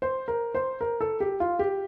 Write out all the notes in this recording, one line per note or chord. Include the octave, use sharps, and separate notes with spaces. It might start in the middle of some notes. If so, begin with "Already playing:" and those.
C5
A#4
C5
A#4
A4
G4
F4
G4